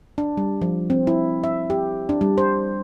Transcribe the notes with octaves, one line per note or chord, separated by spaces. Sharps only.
D4
G3
F3
C4
E4
E5
G4
D4
G3
C5